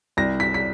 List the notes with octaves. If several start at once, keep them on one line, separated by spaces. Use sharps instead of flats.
C2 A#6
B6
B6